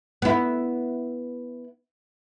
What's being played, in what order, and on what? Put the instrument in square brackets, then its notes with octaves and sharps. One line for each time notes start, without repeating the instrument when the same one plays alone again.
[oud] B3 E4